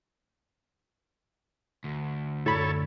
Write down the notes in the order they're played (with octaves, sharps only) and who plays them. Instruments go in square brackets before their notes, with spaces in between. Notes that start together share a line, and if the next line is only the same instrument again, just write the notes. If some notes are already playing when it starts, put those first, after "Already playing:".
[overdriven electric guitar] D2
[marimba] F#2 D3 [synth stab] A2 B5 [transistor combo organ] A4 C#5